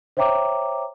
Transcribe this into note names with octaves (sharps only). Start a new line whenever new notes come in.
C5 C#5 E5 G5 A#5 D6